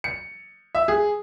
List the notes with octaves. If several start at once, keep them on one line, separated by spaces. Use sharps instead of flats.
C#7
E5
G#4